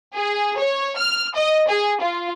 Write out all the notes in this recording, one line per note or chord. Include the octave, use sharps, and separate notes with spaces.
G#4
C#5
F6
D#5
G#4
F4